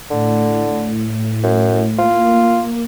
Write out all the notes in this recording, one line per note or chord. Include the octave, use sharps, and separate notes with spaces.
A2 D3
F#2
A#3 F4